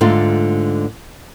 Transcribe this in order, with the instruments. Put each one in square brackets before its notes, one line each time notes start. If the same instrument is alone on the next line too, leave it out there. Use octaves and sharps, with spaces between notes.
[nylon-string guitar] G#2 D3 A3 F4